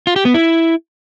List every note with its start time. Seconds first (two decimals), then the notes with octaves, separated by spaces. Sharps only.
0.07 F4
0.16 G4
0.25 B3
0.34 E4